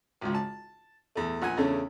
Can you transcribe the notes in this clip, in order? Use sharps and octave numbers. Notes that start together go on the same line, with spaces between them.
G#1 C#2
A5
E2 A3
A#1 F#5 G#5
E2 C#3 A3 C#4 D4